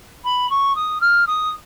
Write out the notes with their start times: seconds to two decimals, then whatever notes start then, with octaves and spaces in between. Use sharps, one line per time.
0.24 B5
0.49 C#6
0.75 D#6
1.01 F6
1.27 D#6